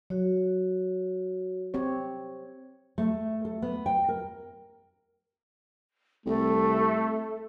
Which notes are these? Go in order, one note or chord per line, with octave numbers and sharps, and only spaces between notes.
F#3 F#4 C#5
C4 G4 C#5
A3
A4
B3
G5
A#4
C2 A3 A4